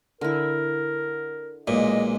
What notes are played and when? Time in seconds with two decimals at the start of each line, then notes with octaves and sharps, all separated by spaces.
0.21 D3 E4 A#4
1.68 B1 A#2 G#3 D#5